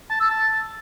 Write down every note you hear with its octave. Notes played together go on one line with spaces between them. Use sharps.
A5
E6
A5